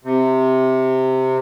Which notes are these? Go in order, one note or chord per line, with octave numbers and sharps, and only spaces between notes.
C3